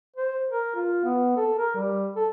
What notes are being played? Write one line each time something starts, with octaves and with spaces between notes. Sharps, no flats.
C5
A#4
F4
B3
A4
A#4
G3
A4